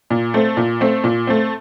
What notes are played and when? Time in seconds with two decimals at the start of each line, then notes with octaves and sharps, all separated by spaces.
0.10 A#2
0.34 A3 C4
0.57 A#2
0.81 A3 C4
1.04 A#2
1.27 A3 C4